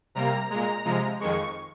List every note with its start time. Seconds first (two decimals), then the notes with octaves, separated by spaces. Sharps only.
0.15 C3 G3 A#3 A#5
0.50 A#2 G#3 A#5
0.85 C3 F3 G#3
1.20 F2 D#3 G#3 C#6